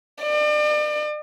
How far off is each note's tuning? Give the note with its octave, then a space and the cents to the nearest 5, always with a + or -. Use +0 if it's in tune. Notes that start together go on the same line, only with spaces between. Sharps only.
D5 +40